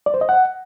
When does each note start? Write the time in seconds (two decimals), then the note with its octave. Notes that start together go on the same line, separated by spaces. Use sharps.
0.06 D5
0.14 C5
0.21 D#5
0.29 F#5